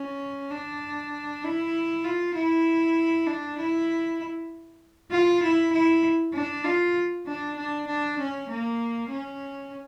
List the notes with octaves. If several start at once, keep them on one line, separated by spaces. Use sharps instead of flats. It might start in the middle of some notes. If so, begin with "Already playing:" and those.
Already playing: C#4
D4
E4
F4
E4
D4
E4
F4
E4
E4
D4
F4
D4
D4
D4
C#4
A#3
C#4